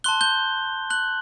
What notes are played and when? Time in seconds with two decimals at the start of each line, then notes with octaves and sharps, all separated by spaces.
0.04 A5 C6 F#6 G7
0.21 G6 G7
0.90 F#6 F#7